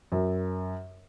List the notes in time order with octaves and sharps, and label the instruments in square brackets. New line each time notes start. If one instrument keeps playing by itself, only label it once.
[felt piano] F#2